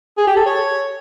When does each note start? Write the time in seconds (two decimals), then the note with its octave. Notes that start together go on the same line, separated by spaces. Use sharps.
0.17 G#4
0.27 G4
0.36 A4
0.46 C#5